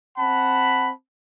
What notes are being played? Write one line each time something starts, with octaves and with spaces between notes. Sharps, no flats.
C4 F#5 A5 B5